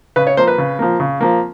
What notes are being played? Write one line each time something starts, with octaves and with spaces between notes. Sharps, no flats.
C#3 B4
C#5
F3 A#3 C5
B4
C#3
F3 A#3
C#3
F3 A#3